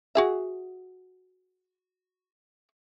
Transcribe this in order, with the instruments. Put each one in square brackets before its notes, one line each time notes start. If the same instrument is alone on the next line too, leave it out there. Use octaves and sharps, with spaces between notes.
[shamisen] F#4 G#4 E5